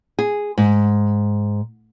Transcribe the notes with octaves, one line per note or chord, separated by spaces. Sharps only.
G#4
G#2